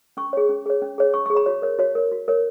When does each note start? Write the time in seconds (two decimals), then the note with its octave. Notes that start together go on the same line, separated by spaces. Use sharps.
0.17 C#4 C#6
0.33 G#4 C#5
0.49 C#4
0.66 G#4 C#5
0.82 C#4
0.98 G#4 C#5
1.14 C#4 C#6
1.26 G#4 C#6
1.35 C#5 B5
1.46 F#4 C#5
1.62 A#4 C#5
1.79 F#4 C#5
1.95 A#4 C#5
2.12 F#4
2.28 A#4 C#5